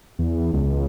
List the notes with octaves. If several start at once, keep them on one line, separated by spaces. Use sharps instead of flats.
E2
C#2